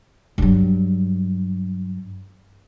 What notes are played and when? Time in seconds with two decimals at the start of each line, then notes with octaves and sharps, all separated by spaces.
0.38 G2 F#3